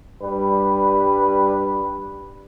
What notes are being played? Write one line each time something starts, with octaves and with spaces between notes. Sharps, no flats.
G2 G3 B4